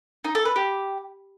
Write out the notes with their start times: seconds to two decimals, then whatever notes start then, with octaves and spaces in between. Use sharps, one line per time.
0.25 D#4
0.35 A4
0.45 B4
0.56 G4